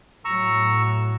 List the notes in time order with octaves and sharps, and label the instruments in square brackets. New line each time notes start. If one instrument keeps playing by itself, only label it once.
[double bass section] A2 F#3 [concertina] A#5 C#6 E6